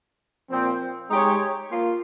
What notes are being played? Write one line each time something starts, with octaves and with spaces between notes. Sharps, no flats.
A#2 F3 C4
G#3 D#4 G4 C#5
A#3 F4